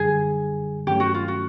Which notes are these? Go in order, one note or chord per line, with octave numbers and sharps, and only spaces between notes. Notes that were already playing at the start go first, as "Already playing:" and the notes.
Already playing: F#2 D3 G3 G#4
G2 D#3 F#3 A3 C#4 G4
F#4
F4
F#4